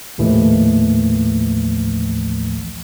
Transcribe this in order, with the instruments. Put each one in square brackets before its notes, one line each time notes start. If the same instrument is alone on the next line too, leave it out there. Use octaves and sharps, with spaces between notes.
[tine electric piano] A#1 D#2 A2 E3 F3 A3